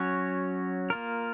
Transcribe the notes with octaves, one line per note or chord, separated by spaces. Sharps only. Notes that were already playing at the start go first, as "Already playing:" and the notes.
Already playing: F#3 C#4 F#4 C#5
A#3 F4 A#4